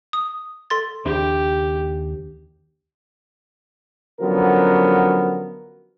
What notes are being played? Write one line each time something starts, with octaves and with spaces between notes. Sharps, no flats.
D#6
A4 C6 A6
D#2 D4 G4
D3 F3 F#3 B3 C#4 A#4